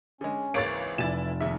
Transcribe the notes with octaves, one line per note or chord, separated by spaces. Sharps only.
D3 G#3 C#4
G#1 C#2 E3 A#3 C#5 A6 D7
F1 E4 D5 G#5 A6 E7
D#2 G#2 E5